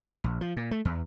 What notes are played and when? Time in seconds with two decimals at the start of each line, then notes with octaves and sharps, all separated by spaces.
0.24 A#1
0.41 F3
0.57 A#2
0.71 A3
0.85 E2